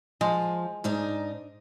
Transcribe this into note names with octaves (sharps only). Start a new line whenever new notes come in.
F3 G#3
G#2 D4 D#4